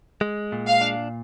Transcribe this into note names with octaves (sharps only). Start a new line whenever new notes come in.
G#3
A#2
F5
D4